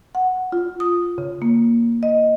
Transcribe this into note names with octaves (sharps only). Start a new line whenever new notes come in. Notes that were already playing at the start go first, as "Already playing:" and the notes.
F#5
F4
D#6
C#3
A#3
D#5